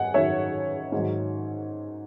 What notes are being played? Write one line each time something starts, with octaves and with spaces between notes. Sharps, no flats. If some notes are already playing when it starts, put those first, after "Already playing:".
Already playing: F#2 D#5 F#5 G#5
F#2 D#3 F#3 C#5 E5
G#2 D#3 F#3